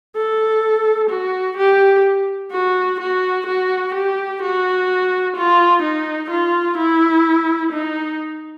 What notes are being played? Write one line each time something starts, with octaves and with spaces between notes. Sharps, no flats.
A4
F#4
G4
F#4
F#4
F#4
G4
F#4
F4
D#4
F4
E4
D#4